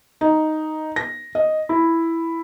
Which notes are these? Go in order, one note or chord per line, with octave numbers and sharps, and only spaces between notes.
D#4
A#6
D#5
E4